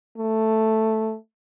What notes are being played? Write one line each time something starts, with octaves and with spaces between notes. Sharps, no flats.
A3